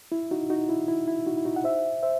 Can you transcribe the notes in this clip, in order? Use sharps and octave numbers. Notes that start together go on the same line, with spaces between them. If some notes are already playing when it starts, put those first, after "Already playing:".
E4
D#4 F#4
D#4 F#4
E4
E4
E4
D#4 F#4
E4
D#4 F#4
F#5
C5 E5
C5 E5